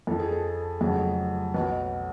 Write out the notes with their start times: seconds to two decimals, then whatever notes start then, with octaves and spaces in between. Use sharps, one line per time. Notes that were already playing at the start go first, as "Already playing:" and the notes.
0.07 F2 F3 A4
0.20 G#4
0.32 A4
0.80 F1 F2 C#3 F#3 G#4
1.54 B1 B2 F#3 B4